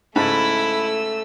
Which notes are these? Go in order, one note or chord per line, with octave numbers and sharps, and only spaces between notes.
G#2 C#3 A3 E4 A5 B5 E6